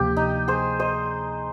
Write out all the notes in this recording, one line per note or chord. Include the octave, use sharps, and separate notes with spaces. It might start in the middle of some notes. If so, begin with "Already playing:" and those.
Already playing: D2 C3 F3 A#3 G4
D#4
G#4 C5
C5 D#5